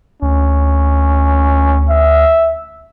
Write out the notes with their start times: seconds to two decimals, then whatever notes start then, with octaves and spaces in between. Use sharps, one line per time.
0.22 D2 C#4
1.89 E5